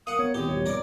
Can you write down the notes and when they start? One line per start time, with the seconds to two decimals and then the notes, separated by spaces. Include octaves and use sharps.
0.07 A#3 F5 F#5 D#6
0.19 B3 C#5
0.34 D#2 A2 C4 G4 C#5 D#6
0.48 D#1 G#1 C#5
0.66 G#1 A#4 D5 D6